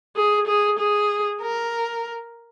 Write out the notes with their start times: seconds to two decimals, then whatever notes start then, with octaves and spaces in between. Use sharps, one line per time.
0.16 G#4
0.47 G#4
0.79 G#4
1.41 A#4